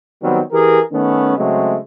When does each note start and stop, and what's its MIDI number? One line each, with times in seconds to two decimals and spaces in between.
0.22 0.40 51
0.22 0.40 54
0.22 0.40 55
0.22 0.40 59
0.22 0.40 60
0.52 0.79 52
0.52 0.79 67
0.52 0.79 68
0.52 0.79 70
0.92 1.33 51
0.92 1.33 57
0.92 1.33 59
0.92 1.33 61
1.37 1.77 49
1.37 1.77 54
1.37 1.77 56
1.37 1.77 57
1.37 1.77 60